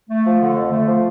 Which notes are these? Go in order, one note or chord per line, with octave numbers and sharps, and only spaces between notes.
A3
F3
D3
F2
A3
F3